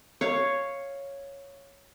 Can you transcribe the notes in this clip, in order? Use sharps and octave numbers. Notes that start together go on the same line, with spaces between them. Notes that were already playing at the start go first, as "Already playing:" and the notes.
C#5 F5